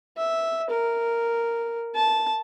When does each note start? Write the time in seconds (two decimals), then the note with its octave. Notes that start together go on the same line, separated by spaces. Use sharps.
0.18 E5
0.70 A#4
1.95 A5